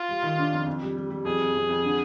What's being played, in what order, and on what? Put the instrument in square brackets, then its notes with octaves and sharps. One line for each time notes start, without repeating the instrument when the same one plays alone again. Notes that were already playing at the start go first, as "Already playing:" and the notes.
Already playing: [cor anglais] F4
[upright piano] G3
D#3
D4
F2
F2
G3
G3
G3
[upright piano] F2 [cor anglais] G#4
[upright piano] F2
F2
F2
D3